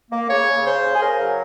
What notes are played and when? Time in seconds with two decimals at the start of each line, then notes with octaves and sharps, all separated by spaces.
0.11 A#3
0.30 C#3 C#5
0.48 C#3
0.66 C#3 C5
0.84 C#3
0.94 G#4
1.01 C#3 A#4
1.20 F#3